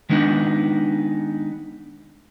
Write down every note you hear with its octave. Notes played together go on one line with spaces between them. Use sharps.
D#3 G#3 B3 D4 D#4